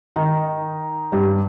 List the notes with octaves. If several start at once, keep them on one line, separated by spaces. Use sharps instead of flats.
D#3 D#4
G2 G3